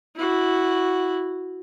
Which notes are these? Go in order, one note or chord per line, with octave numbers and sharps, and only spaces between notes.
E4 F#4